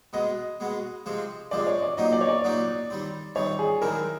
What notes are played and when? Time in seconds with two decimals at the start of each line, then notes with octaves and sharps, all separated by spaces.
0.13 B2 G#3 B3 D#5
0.60 B2 G#3 B3
1.06 C3 F3 G#3 C4
1.51 C3 F3 G#3 C4 D5
1.67 C#5
1.82 D5
1.97 A#2 F#3 A#3 D#4 G4 D#5
2.13 D5
2.21 C#5
2.29 D5
2.44 A#2 F#3 A#3 D#4 G4
2.90 D#3 G3 C4
3.35 D#3 G3 C4 C#5
3.59 G#4
3.82 F#2 D#3 G#3 C4 E4 A#4